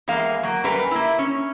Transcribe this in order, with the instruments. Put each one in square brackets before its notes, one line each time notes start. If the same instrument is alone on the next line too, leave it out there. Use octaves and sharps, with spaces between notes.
[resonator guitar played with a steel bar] E2 G#3 A#3 F5 G#5
F#3 A#3
F#2 G3 A#4 B4 G#5
A#3 E4
C#4